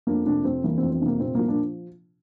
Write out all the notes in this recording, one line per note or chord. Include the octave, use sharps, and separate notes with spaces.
F2 A#3 D4
C3 A#3 D4
F2 C4
E3 A#3
F2 C4
C4
C3 A#3
A#2 C4
F3 A#3
A#3 D4